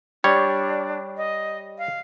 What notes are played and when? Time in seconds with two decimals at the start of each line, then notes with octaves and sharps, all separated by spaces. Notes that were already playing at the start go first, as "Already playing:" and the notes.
0.24 G3 D4 C#5
1.17 D#5
1.78 F5